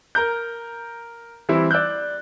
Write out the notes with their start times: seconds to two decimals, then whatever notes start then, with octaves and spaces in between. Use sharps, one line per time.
0.15 A#4 A#5 G6
1.49 E3 G3 C4 E4
1.71 D5 E6 F#6 G6